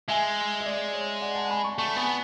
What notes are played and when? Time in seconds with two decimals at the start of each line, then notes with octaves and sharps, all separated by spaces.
0.08 G#3 E5 G#5
0.60 E5
0.66 D5
0.93 C#5
1.21 D5 F#5
1.35 F#5 A5
1.50 G#5 B5
1.64 A5 C#6
1.78 A3 A5 C#6
1.96 B3 G#5 B5